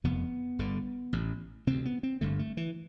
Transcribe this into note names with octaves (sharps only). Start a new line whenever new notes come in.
F1 F2 C3 B3
G1 G2 D3
A1 A2
D2 C3 C4
B3
C4
G1 G2 D3 A3
A3
E3